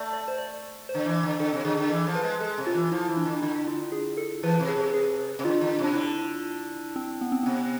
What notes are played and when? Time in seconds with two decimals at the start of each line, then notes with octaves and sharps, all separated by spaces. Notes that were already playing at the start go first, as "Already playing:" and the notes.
Already playing: A3 D5
0.13 D5
0.28 C5
0.38 D5
0.89 C5
0.94 D3
1.06 E3
1.23 D3
1.39 D3 A4
1.53 C3
1.65 D3 G#4
1.77 D3
1.90 E3 A4
2.07 F3
2.15 B4
2.23 G#3
2.40 G#3 A4
2.58 C3
2.66 F4
2.74 E3
2.92 F3 E4
3.09 E3
3.17 D4
3.25 D3
3.42 D3 E4
3.68 F4
3.92 G#4
4.17 A4
4.43 E3 B4
4.59 C3
4.68 G#4
4.76 C3
4.94 G#4
5.39 C3
5.45 D3 F4
5.61 D3
5.78 C3
5.84 D4
5.94 D3 E4
6.96 C4
7.21 B3
7.32 C4
7.43 C3 B3